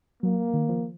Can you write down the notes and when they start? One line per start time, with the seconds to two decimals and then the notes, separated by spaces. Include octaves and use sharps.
0.23 F#3 A#3
0.54 D#3
0.69 F3